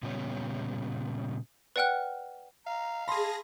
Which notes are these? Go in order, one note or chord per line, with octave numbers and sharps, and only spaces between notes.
A#2 C#3 G3 B3 C#5
B4 D5 F#5 G5 F6 F#6
F5 A#5
G#4 A5 B5 C6 A#6